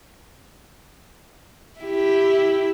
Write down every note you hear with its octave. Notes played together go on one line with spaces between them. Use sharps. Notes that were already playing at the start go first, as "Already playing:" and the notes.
E4 G4